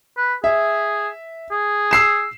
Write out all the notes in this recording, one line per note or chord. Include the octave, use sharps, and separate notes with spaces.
B4
G#4 E5
G#4
E6 C7 E7